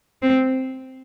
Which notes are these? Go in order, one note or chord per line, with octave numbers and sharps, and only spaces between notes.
C4